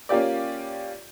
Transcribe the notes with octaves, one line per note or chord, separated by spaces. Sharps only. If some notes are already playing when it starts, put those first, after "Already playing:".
A#3 C#4 F4 G4 D5